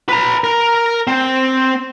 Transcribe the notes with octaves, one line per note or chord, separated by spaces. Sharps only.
B4 A#5
A#4
C4